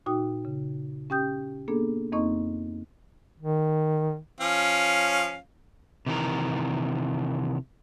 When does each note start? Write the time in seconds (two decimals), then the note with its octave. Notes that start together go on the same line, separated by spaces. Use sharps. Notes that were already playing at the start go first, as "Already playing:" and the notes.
0.06 A#2 D#4 F#4 G5 D#6
0.45 C#3
1.10 C#4 G4 G5 D#6 G6
1.68 A#3 B3 D4 G#4 A4
2.12 F2 A#3 C4 D#4 D#5 C#6
3.40 D#3
4.40 F3 C#4 F5
6.06 C3 D#3 E3 A#4